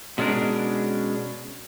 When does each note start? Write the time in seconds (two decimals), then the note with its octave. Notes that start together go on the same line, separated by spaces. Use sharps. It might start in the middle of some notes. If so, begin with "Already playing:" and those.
0.18 B2 G#3 C#4 D4 A#4